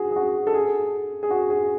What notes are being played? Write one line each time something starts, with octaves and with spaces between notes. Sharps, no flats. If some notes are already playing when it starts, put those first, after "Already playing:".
Already playing: F#4 G#4
G#4
F#4
A4
G#4
G#4
F#4
G#4